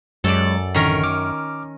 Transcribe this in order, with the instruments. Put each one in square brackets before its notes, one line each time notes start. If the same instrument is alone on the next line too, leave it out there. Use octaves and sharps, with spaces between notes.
[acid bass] F#2 [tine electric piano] F#3 G#3 C#5 [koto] A4 D5
[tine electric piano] A1 D3 [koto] D#3 C#4 A#4
[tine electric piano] D6 F6